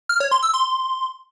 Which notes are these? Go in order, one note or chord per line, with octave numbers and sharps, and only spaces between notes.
F6
C#5
C6
E6
C6